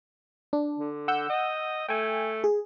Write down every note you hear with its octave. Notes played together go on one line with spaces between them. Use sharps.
D4
D3
F#5 E6 G6
D#5
A3 G5 G#5
G#4